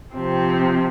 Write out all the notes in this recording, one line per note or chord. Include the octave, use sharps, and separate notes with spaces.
C3 F3 C4